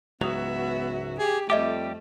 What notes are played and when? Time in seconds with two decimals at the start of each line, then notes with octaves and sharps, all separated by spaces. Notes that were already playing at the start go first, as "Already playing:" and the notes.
0.21 C#2 G#2 F#3 B3 F#4 E5 D#6 F7
1.19 G4 G#4
1.50 F2 G3 A3 G4 D#5 E5 D6